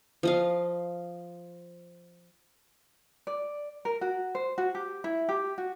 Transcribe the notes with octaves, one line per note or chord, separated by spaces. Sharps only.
F3 D#5 F5
D5
A#4
F#4
C5
F#4
G4
E4
G4
F#4